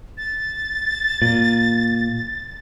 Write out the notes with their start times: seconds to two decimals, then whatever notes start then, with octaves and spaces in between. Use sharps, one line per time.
0.18 A6
1.22 A#2